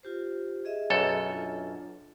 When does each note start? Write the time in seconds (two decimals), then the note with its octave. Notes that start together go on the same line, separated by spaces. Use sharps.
0.03 F4 G4 C5
0.65 G#4 D#5 E5
0.90 B1 F#2 A4
1.27 D4 F4